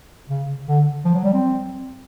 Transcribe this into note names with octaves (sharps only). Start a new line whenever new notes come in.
C#3
D3
F3
F#3
G3
C4